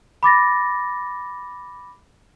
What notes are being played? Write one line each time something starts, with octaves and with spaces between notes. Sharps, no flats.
B5 D6 A6 A#6